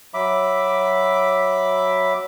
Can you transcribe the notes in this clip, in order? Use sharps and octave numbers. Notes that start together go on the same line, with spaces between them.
F#3 E5 B5 D6